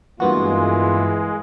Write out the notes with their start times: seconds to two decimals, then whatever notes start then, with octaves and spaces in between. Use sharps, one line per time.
0.20 G2 E3 G#3 A#3 B3 F4 F#4